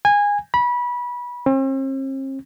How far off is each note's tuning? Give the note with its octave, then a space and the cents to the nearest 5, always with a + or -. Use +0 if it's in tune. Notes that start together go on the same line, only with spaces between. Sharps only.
G#5 -20
B5 -25
C4 +45